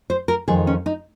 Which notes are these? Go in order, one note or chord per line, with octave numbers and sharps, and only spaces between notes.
C5
A#4
F2 D#3 G#3 G#4
C#4
D#4